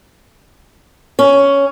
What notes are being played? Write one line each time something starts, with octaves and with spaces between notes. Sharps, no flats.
C#4